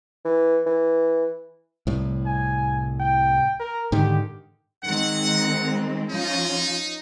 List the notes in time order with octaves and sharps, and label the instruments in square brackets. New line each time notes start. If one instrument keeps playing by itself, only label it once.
[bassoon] E3
E3
[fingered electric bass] C2 A2
[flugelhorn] G#5
G5
A#4
[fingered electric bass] G#2 D3 D#3 [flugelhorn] G4
[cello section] D#3 G#3 C4 [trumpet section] F#5
[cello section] F3 C#4 F4 [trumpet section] D#4